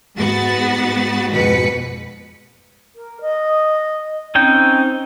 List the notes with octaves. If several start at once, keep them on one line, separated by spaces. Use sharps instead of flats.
G#2 B3 F#4 A6
F2 G#2 B2 B4 B6 C#7
A#4
D#5
C4 C#4 D#4 G5